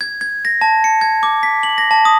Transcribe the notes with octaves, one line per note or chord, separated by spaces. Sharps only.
G#6
G#6
A#6
A5
C#7
G#6
D6
B6
F#7
A#6
A5
D#6